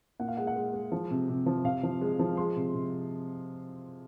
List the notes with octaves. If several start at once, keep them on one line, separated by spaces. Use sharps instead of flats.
A#2 F#5
F5
G#3 F#5
F#5
G#3
G#3
F3
C3
C3
F3
C3 F5
F3
G#3
F3
G#3 C6
C3
C3